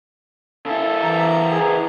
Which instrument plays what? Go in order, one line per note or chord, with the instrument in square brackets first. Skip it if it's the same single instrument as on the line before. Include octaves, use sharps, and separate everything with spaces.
[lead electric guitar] C#3 E4 [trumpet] A4
[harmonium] E3 A#5
[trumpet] G#4